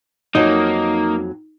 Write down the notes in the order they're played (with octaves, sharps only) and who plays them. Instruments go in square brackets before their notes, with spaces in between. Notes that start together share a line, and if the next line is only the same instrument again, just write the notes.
[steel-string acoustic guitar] F2 F#3 [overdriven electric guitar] A#3 [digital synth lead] D#4